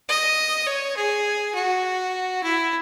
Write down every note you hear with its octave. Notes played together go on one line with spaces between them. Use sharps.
D#5
C#5
G#4
F#4
E4